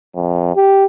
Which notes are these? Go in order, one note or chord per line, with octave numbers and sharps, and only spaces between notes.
F2
G4